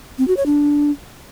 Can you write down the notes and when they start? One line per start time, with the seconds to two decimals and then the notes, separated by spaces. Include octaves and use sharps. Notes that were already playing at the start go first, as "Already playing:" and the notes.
0.18 C4
0.28 F#4
0.37 C#5
0.46 D4